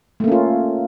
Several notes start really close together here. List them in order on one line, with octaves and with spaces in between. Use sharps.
A3 A#3 C#4 F4